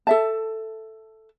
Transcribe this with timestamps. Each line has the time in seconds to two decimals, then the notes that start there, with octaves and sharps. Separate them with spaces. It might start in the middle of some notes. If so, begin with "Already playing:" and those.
0.07 A4 E5 A5